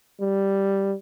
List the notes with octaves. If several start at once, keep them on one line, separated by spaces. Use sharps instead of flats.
G3